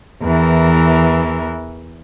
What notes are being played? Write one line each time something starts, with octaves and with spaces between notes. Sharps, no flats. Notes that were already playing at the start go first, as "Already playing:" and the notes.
E2 E3 A#4